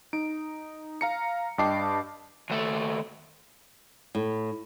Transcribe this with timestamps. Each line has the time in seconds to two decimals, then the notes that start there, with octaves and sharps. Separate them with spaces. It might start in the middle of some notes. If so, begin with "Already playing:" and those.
0.13 D#4 D7
1.01 F5 A#5 C#7
1.58 G2 D#5 G5 A5 D6 C7
2.50 D#2 A3
4.15 A2